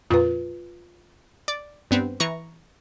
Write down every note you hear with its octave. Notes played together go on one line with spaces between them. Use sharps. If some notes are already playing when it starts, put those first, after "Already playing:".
F2 A#2 F4 B4
D5
G2 B3 C4
E3 A#5 C#6